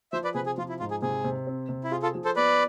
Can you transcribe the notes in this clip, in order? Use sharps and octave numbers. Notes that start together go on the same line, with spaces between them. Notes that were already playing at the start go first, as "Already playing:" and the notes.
F3 C5 E5
B4 D5
C3 G#4 B4
G#4
F3 F4
E4
G#2 F4
G#4
C3 G#4
C3
C4
C3
E4
F4 G#4
F4 A4
F3
A4 C5
B3 B4 D5